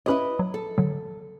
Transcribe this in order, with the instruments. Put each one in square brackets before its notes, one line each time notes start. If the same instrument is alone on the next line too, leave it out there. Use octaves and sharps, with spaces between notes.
[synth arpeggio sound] C#4 G4 C#5 [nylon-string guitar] E4 B4 D#5
[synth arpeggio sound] F#3
[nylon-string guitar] A4
[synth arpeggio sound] D3 D#3 F#3